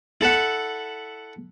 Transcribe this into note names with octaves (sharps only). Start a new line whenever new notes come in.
E4 A4 E5 F#5